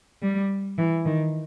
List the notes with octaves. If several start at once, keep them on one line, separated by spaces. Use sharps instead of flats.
G3
E3
D#3